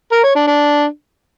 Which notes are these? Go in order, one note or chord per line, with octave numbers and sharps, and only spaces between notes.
A#4
C#5
D4
D4